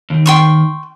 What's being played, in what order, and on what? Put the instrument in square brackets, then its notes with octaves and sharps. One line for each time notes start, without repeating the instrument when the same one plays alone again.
[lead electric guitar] D#2 D#3
[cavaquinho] G5 C6 C#6